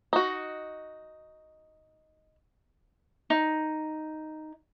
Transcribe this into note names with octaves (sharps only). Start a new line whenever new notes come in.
D#4 F#4
D#4